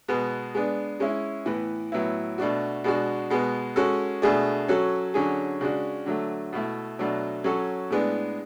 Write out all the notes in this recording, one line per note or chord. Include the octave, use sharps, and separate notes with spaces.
B2 G#3 B3
G#3 B3 D4
G#3 C#4 E4
A2 E3 B3
A2 F#3 B3 E4
B2 A3 D4 F#4
B2 G#3 D4 F#4
B2 G#3 B3
G#3 C#4 F#4 A4
B2 A3 D4 G#4
F#3 C#4 F#4 A4
D3 F#3 C#4 G#4
C#3 G#3 D4 F#4
D3 F#3 A3
B2 A3 E4
B2 F#3 A3 D4
F#3 C#4 F#4 A4
A2 G#3 B3 D4